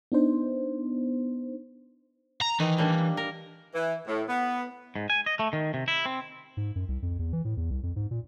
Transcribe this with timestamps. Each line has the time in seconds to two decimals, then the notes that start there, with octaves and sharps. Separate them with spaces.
0.12 B3 D4 D#4 C5
2.41 A#5
2.60 D#3 E3
2.78 G3 A#3 D4
3.17 A#4
3.74 E3
4.06 A2
4.27 B3
4.96 G#2
5.10 G#5
5.26 D#5
5.39 A3
5.53 D#3
5.74 C3
5.88 E4
6.06 C4
6.57 G#2
6.76 F#2
6.88 C2
7.02 F2
7.19 E2
7.33 E3
7.45 A2
7.57 E2
7.70 C2
7.83 F2
7.96 G#2
8.11 A#2